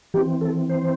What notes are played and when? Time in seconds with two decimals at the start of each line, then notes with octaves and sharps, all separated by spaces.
0.14 E3 C4 G4
0.41 A4
0.69 C5